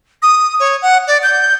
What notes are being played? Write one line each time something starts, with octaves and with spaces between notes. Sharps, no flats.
D#6
C#5
F#5
D5
G6